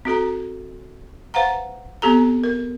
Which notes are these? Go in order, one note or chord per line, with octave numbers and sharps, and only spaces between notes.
C4 F#4 A4 A#5
B4 C5 F5 F#5 A#5
B3 C4 G4 A4 A#5
A#4